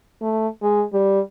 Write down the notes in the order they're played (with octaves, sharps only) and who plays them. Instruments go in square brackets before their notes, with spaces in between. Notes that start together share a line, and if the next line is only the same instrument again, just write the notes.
[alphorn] A3
G#3
G3